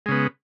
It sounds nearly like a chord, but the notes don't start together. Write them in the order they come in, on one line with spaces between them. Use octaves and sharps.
G#3 C#3 B3